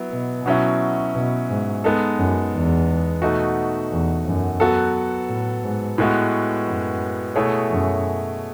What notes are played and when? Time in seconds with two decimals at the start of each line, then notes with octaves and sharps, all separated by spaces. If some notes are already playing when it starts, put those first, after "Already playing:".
Already playing: F#3 B3 E4
0.11 B2
0.46 B2 F#3 C#4 E4
1.15 B2
1.50 G#2
1.84 G#3 B3 D#4 A4
2.19 F#2
2.53 E2
3.22 B2 A3 D#4 F#4
3.91 E2
4.26 F#2
4.60 F#3 B3 F#4 A4
5.29 A2
5.63 G#2
5.98 A2 G#3 B3 F#4
6.67 F#2
7.36 B2 A3 E4 G#4 C#5
7.70 F#2